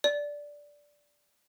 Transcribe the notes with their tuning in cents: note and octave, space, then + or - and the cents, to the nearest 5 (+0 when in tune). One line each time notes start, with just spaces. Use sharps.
D5 -5